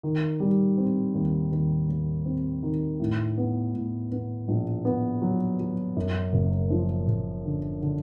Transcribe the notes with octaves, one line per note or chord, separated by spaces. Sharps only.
D#3
G3
C4
D#2
D#2
D#2
C4
D#3
A2
B3
A2
B3
A#1
B3
F#3
F#3
F#2
F#1
F3
F#1
D3
D3